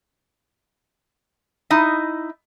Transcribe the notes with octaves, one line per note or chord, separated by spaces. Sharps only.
D#4 E4 D#5